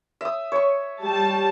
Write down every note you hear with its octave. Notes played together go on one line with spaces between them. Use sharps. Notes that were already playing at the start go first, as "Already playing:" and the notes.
E5 D#6
C#5 C#6
G3 A5